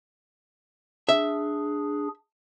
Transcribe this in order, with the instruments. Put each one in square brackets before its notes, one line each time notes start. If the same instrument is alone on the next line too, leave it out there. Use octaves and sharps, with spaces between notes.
[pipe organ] D4 G#4 [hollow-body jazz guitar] E5